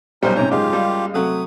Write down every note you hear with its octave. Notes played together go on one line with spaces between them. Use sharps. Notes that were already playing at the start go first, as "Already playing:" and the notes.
B1 G3 C#4 D#4 A#4 C5 G6
G#2 C3 C#4 C#5 A#5
F#1 G#3 F4 G4 F5
G3
C3 F#3 A3 D#6